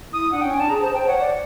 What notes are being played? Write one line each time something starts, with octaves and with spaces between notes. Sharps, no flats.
E4 D#6
D4 F#5
C#4 G5
G#5
D4 A5
G#4 A#5
C5 A5
C5 G5
C#5 F#5
D5